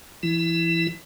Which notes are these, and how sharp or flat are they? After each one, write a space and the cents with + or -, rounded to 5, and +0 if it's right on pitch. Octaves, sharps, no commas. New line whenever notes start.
E3 +30 E4 +0